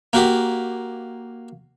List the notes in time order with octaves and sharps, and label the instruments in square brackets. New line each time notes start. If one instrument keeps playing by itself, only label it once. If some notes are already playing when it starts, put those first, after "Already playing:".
[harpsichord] A#3 F#4 G4